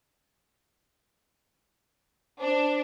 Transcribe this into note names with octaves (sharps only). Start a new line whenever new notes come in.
D4 C5